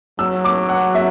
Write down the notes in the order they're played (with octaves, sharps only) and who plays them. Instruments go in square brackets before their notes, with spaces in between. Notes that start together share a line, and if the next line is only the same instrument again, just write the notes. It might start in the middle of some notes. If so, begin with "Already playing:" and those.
[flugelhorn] F#3 [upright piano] E6
[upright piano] D6
F#5
E5